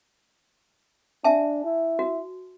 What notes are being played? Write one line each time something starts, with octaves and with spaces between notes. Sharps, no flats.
D4 E5 G#5 A5
E4
F#4